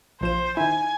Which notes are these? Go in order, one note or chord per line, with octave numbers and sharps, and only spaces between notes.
A#1 F3 C5 E7
D#3 E4 G#5